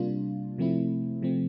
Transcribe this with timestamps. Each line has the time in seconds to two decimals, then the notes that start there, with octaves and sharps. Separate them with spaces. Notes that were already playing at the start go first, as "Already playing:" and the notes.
Already playing: C3 G3 A#3 D4 F4
0.58 C3 F3 A3 C4 E4
1.22 C3 F3 A3 C4